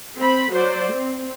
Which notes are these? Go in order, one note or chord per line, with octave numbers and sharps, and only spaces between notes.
C4 B5
F#3 C5 D5
C4